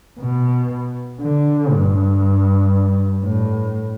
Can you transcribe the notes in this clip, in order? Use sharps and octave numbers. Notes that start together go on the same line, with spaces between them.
B2
D3
G2
A2